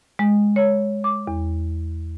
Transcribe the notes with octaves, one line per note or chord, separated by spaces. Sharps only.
G#3
C#5
D6
E2